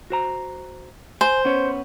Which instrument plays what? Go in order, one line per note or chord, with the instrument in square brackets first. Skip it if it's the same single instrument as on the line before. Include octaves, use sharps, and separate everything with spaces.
[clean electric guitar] F#4 C5 A#5
[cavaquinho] C5 [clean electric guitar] G#5
[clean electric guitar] B3 C#4 C#5